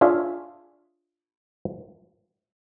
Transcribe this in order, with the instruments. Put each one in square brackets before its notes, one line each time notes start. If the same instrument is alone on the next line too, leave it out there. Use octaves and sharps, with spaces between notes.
[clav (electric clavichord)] D4 F4 G#4 C#5 E5 F5